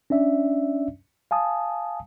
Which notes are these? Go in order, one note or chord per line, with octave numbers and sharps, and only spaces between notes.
C#4 D4 D5 E5
F5 G#5 A5 D#6